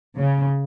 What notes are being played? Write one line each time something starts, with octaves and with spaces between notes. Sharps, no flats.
C#3